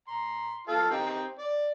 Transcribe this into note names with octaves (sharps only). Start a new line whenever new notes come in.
A#5 C6
F4 A4 F5
C4 D#4 G4
D5